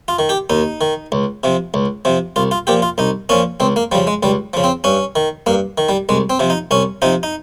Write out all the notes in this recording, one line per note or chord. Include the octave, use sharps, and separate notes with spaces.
F4
D#3
G4
D#2 D#4
D#3
C#2
C3 F3
C#2
C3 F3
C2 F4
F4
A#2 F3 G4
F4
C2 D#4
A#2 F3 C#4
C#2 C4
A#3
C#3 F3 G3
G#3
C#2 G3
C#3 F3
C4
G2 C#4
D#3
G2 A#3
D#3
G3
C2 G#3
C4
C3 F3
D#4
C2 C#4
C3 F3 D#4
D#4